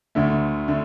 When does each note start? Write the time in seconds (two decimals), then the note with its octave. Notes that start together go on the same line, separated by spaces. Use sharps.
0.15 D2 D3 A3
0.68 D3 A3